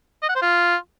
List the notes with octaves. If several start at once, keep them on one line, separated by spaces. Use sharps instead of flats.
D#5
F#5
C5
F4